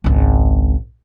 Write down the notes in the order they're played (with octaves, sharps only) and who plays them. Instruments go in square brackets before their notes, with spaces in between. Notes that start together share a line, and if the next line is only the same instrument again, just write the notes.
[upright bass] G#1 C#2